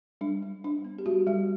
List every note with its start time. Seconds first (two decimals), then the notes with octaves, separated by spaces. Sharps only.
0.21 G3 D4
0.43 G3
0.64 D4
0.85 B3
0.99 G4
1.06 G3 F#4
1.27 G3